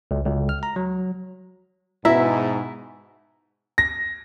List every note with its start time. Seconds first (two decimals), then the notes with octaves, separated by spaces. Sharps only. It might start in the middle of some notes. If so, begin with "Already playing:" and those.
0.11 C#2
0.25 C#2
0.49 F6
0.63 A#5
0.76 F#3
2.05 G#2 B2 E4 E5 A#5
3.78 A#6